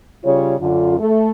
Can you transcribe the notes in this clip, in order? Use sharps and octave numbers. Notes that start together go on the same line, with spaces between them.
C#3 G3 F4 C#5
F#2 D3 F4
A3 A4